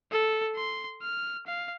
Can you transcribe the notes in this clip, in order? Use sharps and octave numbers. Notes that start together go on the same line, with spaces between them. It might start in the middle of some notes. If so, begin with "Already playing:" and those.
A4
C6
F6
F5